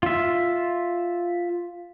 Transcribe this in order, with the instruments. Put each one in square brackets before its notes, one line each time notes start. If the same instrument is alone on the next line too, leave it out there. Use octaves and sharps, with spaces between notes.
[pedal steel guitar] F4 E5